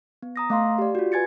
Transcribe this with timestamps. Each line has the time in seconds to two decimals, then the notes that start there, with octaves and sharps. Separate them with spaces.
0.23 B3
0.36 A#5 D#6 A#6
0.50 A3 F5 C6
0.78 G4 D5
0.95 F4 F#4
1.12 B4 G#5 G#6 A6 C#7